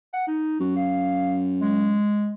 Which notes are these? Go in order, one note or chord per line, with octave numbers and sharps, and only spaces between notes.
F#5
D#4
F#2 F#4
F5
G#3